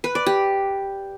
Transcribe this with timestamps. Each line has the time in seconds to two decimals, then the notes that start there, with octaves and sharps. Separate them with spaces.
0.04 B4
0.15 D5
0.26 G4